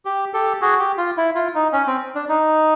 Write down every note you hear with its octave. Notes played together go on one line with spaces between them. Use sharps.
G4
G4 A4
F#4 G#4
G4
F4
E4
F4
D#4
C#4
C4
D4
D#4